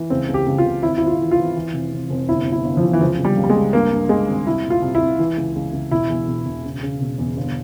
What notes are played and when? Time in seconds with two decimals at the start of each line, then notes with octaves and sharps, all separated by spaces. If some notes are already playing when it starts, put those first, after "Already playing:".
Already playing: E3
0.10 C#2 C4
0.28 C#2
0.34 G4
0.46 C#2
0.58 F4
0.65 C#2
0.82 G#1 E4
0.98 G#1 E4
1.07 F4
1.20 E3
1.31 F4
1.38 E3
1.56 E3
1.74 F1
1.91 F1
2.10 F1
2.28 G1 E4
2.46 G1
2.52 E4
2.64 G1
2.77 F3
2.82 E3
2.93 E3
3.00 C#2 F3
3.19 C#2
3.25 G3
3.37 C#2
3.44 G3
3.50 G#3
3.55 C#2
3.73 G2 A#3
3.92 G2
4.09 G2 G#3
4.28 G#1
4.46 C2 E4
4.64 A#2
4.70 F4
4.82 C2
4.95 E4
5.01 C2
5.19 E3
5.37 C#2
5.56 C#2
5.73 C#2
5.91 E1 E4
6.09 E2
6.28 E1
6.45 E1
6.64 C#3
6.83 C#3
7.01 E1
7.18 E2
7.37 G1